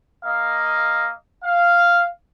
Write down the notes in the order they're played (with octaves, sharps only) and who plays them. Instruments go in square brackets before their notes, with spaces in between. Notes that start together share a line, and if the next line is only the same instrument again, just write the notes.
[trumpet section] A#3 D#5 F5
F5